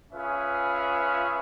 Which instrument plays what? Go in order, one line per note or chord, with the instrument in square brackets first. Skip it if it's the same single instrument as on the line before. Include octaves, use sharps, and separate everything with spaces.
[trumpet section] C#4 F4 G#4 B4 E5